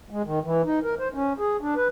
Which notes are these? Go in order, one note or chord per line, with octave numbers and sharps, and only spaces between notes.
G#3
D#3
E3
D#4
A#4
C5
C#4
G#4
D4
B4